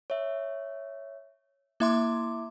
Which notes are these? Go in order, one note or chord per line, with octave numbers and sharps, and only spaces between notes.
C#5 E5
A#3 E4 E5 C6 D6